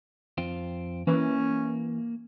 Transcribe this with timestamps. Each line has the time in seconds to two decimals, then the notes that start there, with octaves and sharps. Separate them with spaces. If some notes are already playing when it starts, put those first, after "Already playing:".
0.38 F2 C4 F4
1.07 E3 A#3 C#4